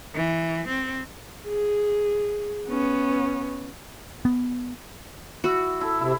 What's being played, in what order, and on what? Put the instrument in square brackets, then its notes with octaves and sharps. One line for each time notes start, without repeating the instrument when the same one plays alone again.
[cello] E3
C4
[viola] G#4
B3 C#4
[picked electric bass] B3
[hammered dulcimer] E4 [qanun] F#4 [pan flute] E6
[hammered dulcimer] E4 A4
[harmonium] C3 [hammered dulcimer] E4